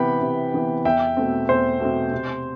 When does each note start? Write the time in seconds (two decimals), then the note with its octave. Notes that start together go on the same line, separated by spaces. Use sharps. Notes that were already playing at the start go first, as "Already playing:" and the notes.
Already playing: C3 E3 B3 G5 B5
0.21 C3
0.54 E3 B3
0.85 E2 E5 G5
1.17 B2 A3 C4
1.48 E2 C5
1.80 B2 A3 C4
2.11 C3